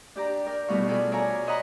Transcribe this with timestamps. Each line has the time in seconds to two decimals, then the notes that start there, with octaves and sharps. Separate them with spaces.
0.16 D4 G4 D5 A#5
0.46 A#4 D5 G5
0.68 B2 G3 A3 E4 F5 C#6
0.88 F4 F#4 G#4 A4 B4 D5
1.12 C#5 D5 E5 F5 G#5 A#5
1.46 C5 C#5 D#5 F#5 A#5 B5